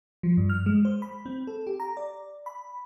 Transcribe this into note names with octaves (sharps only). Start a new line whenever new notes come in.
F3
G2
F6
G#3
C5
B5
C4
A4
G4
A#5
D5
B5